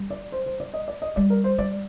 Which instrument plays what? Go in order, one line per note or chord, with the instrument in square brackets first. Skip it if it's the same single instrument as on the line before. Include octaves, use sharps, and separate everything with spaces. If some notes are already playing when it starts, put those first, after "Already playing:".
Already playing: [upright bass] G3
[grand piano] D5
C5
C5
D5
D#5
D5
D#5
[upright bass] G3 [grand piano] D5
[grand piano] A#4
C5
[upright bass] G3 [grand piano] D5